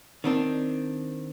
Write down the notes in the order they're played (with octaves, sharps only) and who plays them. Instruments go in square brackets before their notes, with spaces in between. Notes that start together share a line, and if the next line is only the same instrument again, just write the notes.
[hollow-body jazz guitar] D#3 C4 D4